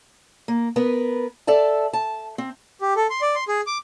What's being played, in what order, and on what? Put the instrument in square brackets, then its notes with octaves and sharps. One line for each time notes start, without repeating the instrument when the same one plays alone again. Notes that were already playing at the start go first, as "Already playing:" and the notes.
[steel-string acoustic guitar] A#3
B3 A#4 B4
A4 D5 E5 A5
A5
C4
[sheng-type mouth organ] G4
A4
C6
D5
C6
G#4
D6